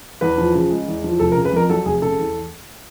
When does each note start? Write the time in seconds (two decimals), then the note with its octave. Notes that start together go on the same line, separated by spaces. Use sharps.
0.21 E2 B4
0.38 F3
0.55 C#3
0.70 G#3
0.88 E2
1.04 F3
1.19 F1 A4
1.32 A#4
1.36 C#3
1.45 B4
1.52 F2 A#4
1.70 F#3 A4
1.85 F1 G#4
2.02 C#3 A4
2.19 E2